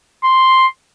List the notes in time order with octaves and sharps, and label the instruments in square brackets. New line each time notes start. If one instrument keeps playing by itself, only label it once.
[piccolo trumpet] C6